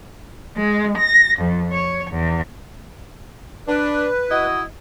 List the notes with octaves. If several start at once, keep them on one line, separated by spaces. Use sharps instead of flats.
G#3
A#6
F2
C#5
E2
D4 B4
E4 F#4 D#5